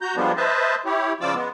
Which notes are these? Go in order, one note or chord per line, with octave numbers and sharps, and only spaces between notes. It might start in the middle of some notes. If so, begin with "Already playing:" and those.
F#4 A#5 G6
F3 G3 G#3 A#3 B3 D4
B4 C5 D#5 E5 A5
E4 G4 C#5
C#3 F3 F4 D5 D6 E6
G#3 B3